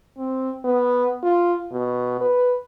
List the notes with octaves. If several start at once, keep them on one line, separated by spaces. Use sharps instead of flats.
C4
B3
F4
B2
B4